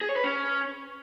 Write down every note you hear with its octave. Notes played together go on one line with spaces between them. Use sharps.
G#4
C#5
B4
C#4